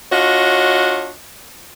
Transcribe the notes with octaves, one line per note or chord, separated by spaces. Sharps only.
D4 F4 F#4 C#5 D#5